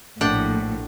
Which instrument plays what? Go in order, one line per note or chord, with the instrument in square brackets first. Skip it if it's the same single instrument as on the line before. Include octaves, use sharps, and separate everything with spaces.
[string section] A#1 A2 [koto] D4 F#5 G5